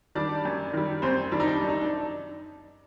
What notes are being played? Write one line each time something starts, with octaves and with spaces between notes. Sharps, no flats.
D#3 G3 D4 D5
F#2
D#3 G3
F#2 C4 C5
D#3 G3 D4
D#4
D4
F#2
D#4
D4